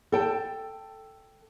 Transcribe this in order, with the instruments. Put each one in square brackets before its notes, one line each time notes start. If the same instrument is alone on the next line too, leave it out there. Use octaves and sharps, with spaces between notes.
[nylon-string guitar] A4 G5 A5